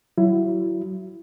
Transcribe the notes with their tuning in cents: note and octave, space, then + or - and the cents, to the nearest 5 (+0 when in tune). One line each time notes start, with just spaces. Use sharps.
F#3 +25 E4 +25